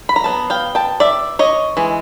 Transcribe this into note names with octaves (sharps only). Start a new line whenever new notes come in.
B5
A#5
F#3 B3 A5
F5 G5
G5 A5
D5 E5
C#5 D#5
E3 G#3